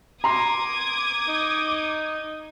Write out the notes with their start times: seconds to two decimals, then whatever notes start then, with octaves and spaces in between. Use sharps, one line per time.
0.24 A#5 C6 D6 D#6 G#6 C7
1.28 D#4